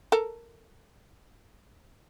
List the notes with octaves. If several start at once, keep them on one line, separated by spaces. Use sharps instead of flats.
A4 A#4